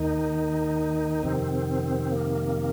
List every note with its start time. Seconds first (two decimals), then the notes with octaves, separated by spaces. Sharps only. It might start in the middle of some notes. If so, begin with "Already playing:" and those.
Already playing: D#2 D#3 D#4
1.23 F2 C3 D#3 C4
2.12 A#3